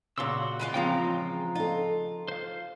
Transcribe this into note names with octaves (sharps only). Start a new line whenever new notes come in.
A#2 C#3 F#4 C6 E6
E3 G#3 F4
C#3 F3 C4 G5 A#5
D#4 F4 A4
C5 F5